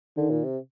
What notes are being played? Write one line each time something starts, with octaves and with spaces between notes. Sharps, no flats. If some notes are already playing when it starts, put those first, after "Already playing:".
D3 D#3
A#2
C3